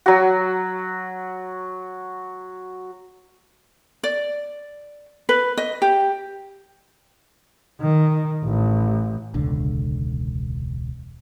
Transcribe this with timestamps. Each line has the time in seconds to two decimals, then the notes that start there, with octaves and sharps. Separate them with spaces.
0.06 F#3 F#4
4.03 D5
5.29 B4
5.57 D#5
5.82 G4
7.81 D#3
8.45 A1
9.34 E1 C#2 D3